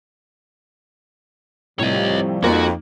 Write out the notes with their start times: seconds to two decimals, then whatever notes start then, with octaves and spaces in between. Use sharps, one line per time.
1.79 A2 C3 F3 G3 C#5 D#5
2.44 F2 A#3 D#4 F#4